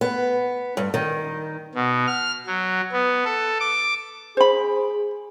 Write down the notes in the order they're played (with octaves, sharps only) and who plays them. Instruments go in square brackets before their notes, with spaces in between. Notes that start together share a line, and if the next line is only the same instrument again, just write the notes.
[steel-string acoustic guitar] B3
G2
D#3
[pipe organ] B2
F6
F#3
B3
A4
D6
[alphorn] G#4 [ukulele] C5 B5